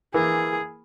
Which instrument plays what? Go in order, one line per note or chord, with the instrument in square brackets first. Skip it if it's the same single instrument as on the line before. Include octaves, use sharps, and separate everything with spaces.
[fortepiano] E3 A#3 [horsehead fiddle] G#4